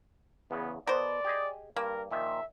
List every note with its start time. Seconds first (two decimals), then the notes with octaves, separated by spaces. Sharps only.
0.51 E2 C#3 B3
0.87 B2 B3 A#4 C5 D5
1.25 G4 G#4 D#5
1.76 G2 A#3 A#4
2.11 A#2 D#3 F3 E5